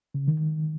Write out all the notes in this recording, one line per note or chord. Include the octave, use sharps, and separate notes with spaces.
C#3
D#3